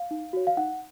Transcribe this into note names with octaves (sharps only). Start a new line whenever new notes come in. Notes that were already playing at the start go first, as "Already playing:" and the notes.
Already playing: F5
D#4
F#4 C#5
F5
D#4 F#5